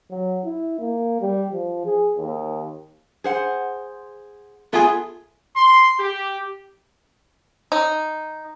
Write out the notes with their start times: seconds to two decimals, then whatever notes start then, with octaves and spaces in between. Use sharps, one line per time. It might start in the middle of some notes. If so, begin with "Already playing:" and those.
0.11 F#3
0.44 E4
0.79 A#3
1.21 G3
1.53 F3
1.85 G#4
2.17 D#2
3.24 G#4 C5 F#5
4.73 A3 B3 F4 G#4
5.56 C6
5.99 G4
7.72 D#4